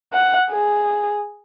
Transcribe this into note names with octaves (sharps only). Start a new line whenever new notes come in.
F#5
G#4